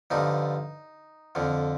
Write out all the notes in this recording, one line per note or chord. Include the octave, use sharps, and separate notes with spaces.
G2 D3 F3 D#4
F2 D3 F3